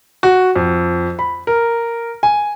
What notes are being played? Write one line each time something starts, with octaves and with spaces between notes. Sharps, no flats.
F#4
F2
B5
A#4
G#5